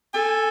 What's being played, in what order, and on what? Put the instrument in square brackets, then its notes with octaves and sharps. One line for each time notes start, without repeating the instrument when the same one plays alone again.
[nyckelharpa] A4 [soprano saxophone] G#5